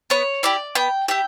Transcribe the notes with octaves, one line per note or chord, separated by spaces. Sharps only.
B3 C#5
E4 G4 D5
B3 G5
E4 G4 G5